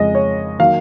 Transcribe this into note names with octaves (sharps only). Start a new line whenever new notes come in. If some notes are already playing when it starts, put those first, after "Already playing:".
Already playing: F2 C#3 G#3 D#5
C#5
D#3 F#3 A#3 F5